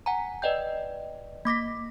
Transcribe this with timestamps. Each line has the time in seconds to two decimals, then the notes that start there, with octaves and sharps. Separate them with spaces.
0.06 F#5 G#5 A#5
0.42 B4 D5 D#5 G5 G6
1.45 A#3 D6 A#6 B6